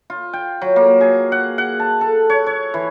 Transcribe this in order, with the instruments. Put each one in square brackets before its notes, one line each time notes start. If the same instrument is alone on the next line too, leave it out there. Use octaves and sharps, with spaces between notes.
[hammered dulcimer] F4
G5
F#3
A#3
G#4
F#5
F#5
A5
A4
C#5
C#5
E3